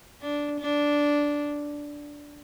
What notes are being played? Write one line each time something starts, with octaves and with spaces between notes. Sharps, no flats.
D4
D4